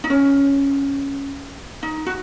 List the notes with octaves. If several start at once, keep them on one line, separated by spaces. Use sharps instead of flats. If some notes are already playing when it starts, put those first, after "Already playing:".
D#4
C#4
D#4
F#4